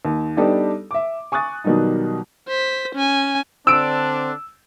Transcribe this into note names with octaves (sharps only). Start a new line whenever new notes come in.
D#2
G3 B3 D4 D#4 G4 A4
E5 D6
G#5 C#6 D#6 F#6 A6
B2 D#3 F#3 G3 D#4
C5 B6
C#4 G#5
D3 C4 D4 E6 D7